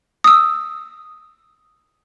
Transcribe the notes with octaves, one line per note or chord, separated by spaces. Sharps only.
D#6 E6